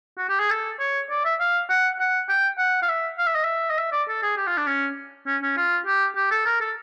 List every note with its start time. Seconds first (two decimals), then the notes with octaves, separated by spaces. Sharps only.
0.18 F#4
0.29 G4
0.39 G#4
0.50 A4
0.79 C#5
1.10 D5
1.25 E5
1.40 F5
1.69 F#5
1.99 F#5
2.29 G5
2.58 F#5
2.82 F5
2.89 E5
3.18 F5
3.26 E5
3.35 D#5
3.44 E5
3.70 D#5
3.78 E5
3.92 D5
4.08 A4
4.23 G#4
4.37 G4
4.47 F4
4.57 D4
4.67 C#4
5.27 C#4
5.42 C#4
5.57 F4
5.86 G4
6.16 G4
6.31 A4
6.46 A#4
6.61 A4